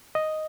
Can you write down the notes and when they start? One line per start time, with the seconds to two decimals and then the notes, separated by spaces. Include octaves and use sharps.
0.15 D#5